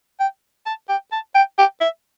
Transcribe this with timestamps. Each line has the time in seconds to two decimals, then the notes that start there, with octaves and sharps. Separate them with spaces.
0.20 G5
0.66 A5
0.89 G5
1.12 A5
1.35 G5
1.58 G5
1.81 E5